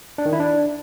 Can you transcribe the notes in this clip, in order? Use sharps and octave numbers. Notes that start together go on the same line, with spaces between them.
D4
D#3
E4
D4